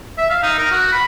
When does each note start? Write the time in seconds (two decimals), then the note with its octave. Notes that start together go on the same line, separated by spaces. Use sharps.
0.18 E5
0.30 F5
0.43 D#4
0.58 A#4
0.71 F#4
0.92 B5